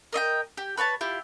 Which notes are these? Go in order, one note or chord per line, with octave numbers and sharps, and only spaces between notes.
A#4 D#5 E5 G5
G4
B4 C#5 G#5 A5
E4 F4 G4